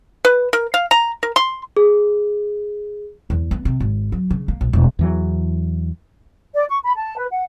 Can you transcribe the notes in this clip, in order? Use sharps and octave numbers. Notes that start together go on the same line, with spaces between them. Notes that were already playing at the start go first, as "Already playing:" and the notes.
B4
A#4
F5
A#5
A#4
C6
G#4
E2
B3
C3
G#1
F#3
C#3
A#3
A#1
E1
E2 E3 F#3
D5
C#6
B5
A5
B4
F#5